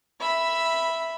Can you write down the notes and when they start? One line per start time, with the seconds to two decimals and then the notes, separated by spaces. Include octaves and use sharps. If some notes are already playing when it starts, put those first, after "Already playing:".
0.20 E5 B5